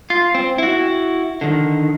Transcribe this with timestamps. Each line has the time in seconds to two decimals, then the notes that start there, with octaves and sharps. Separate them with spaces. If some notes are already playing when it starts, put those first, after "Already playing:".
0.10 F4
0.35 C4
0.58 E4 F#4
1.41 D3 D#3